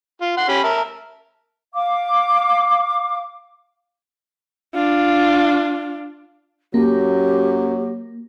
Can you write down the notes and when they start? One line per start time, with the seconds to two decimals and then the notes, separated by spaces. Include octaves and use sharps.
0.21 F4
0.37 F#5 C6
0.49 C#4 G4 B5
0.64 A#4 E5 A5
1.74 F5 D6
4.74 D4 F4
6.74 F#2 F#3 A#3 G4